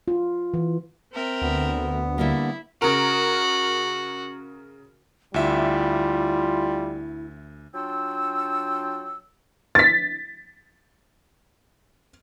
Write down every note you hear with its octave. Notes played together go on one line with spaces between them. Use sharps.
F4
E3
C4 A#4 E5
D2 B3
D3 G3 A#3 E4
C#3 F#4 A#4
D2 G3 E4 F4 E5
F#3 D4 F4 G5 E6
A6 B6